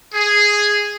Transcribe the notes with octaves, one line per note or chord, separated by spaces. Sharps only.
G#4